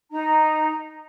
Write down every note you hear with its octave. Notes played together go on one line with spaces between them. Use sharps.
D#4 A#5